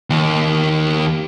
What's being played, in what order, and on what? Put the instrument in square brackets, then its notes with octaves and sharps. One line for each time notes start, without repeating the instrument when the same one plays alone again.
[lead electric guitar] D#2